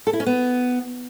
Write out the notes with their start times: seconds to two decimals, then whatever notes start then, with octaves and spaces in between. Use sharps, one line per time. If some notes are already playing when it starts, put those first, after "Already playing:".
0.07 A4
0.13 E4
0.20 C#4
0.26 B3